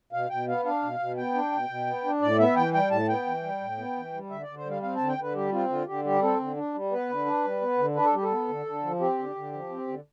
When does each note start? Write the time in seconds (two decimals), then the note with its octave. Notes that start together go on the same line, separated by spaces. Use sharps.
0.13 B2 F5
0.30 B2 G5
0.48 B3 F5
0.65 D4 F5
0.82 B2
1.00 B2
1.17 B3 G5
1.34 D4
1.52 B2
1.69 B2
1.87 B3
2.04 D4
2.21 A2 D5
2.39 B3 E5
2.56 E3 G5
2.73 G3 G5
2.91 A2 A5
3.09 B3 G5
3.26 E3
3.43 G3
3.60 A2
3.78 B3
3.96 E3
4.14 G3
4.30 D3 E5
4.43 D3 D5
4.57 C5
4.65 G3
4.70 F5
4.82 C4 F5
4.96 D3 A5
5.08 G5
5.18 D3 B4
5.34 G3 G4
5.52 C4 F4
5.69 D3 F4
5.87 D3 G4
6.04 G3 G4
6.22 C4 A4
6.39 D3
6.56 D4
6.74 G3
6.91 B3 B4
7.10 D3
7.26 D4
7.44 G3
7.61 B3
7.78 D3
7.95 D4 B4
8.05 A4
8.13 G3 G4
8.23 A4
8.31 B3
8.48 D3
8.66 D3
8.83 F3
9.00 C4 G4
9.18 D3
9.35 D3
9.52 F3
9.70 C4
9.88 D3